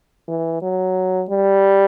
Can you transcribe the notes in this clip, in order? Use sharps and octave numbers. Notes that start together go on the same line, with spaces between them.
E3
F#3
G3